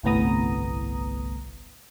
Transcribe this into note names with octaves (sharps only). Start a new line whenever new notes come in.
G1 C2 A2 B3 A#5 D#6